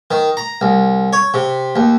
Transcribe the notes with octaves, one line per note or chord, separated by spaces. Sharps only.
D#3
A#5
C2
C#5
C3
D#2